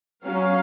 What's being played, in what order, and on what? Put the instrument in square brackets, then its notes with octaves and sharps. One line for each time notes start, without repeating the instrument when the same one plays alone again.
[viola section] F#3 C#4 F5